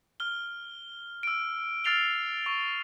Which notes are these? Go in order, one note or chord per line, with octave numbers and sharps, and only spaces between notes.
F6 G7
E6 D7
E6 F6 A6 C7 F7 G7
C#6